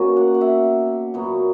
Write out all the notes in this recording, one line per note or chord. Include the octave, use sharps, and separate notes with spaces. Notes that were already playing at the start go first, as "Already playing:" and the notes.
Already playing: B2 A#3 C#4 G#5 A#5
F#5
F#5
E5
A#2 F#3 B3